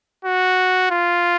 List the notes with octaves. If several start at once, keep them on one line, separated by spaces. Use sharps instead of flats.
F#4
F4